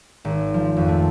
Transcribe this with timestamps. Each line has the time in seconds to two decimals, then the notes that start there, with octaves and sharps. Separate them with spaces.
0.25 G#1
0.54 F3
0.77 F2
0.88 A3